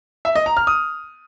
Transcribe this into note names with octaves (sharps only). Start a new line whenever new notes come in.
E5
D#5
A#5
F6
D#6